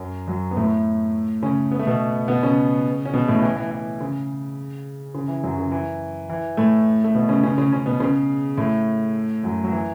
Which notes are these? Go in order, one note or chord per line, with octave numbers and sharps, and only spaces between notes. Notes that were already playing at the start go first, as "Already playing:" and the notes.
Already playing: F#2 F#3
F#2 F#3
B3
A2 A3
C#3 C#4
B3
A3
B2 B3
B2 B3
C#3 C#4
C#4
B2 B3
A2 A3
E3
E3
E3
C#3
C#3
E3
F#2 F#3
C#3
E3
E3
A2 A3
A3
B2 B3
C#3 C#4
C#3 C#4
C#3 C#4
C#3 C#4
B2 B3
C#3 C#4
A2 A3
F#2 F#3
F#3
E3